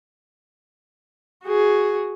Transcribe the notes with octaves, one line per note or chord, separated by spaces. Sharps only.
F#4 G#4